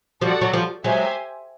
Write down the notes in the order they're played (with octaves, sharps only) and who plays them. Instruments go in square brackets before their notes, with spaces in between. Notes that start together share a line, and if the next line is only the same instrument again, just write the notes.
[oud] F3 G3 [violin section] F#4 A4 D5 F#5
[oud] F#3
F3 G3
[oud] F#3 G#3 [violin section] G4 C5 E5 G#5